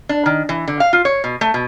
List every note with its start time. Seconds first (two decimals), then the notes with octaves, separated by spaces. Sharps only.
0.09 D4
0.26 D#3
0.49 E3
0.68 D3
0.80 F5
0.93 F4
1.05 C#5
1.24 B2
1.41 A3
1.54 B2